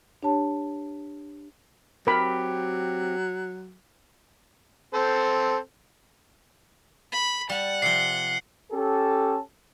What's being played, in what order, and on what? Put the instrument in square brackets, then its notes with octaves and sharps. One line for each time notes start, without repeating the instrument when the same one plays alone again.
[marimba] D4 G4 C#5 A5
[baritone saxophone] F#3 [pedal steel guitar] C4 G4 [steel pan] A#4 B5
[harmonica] C4 A4 C5
[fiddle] B5
[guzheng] G3 A5 [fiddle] F#5
[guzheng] C3 F3 [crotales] C7 G7
[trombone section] C#4 G4 A4